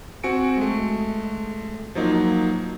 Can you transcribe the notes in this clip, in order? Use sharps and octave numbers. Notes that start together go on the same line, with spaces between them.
C4 F#4 G#5 C#7 D7
G#3 A3
F3 F#3 A#3 D#4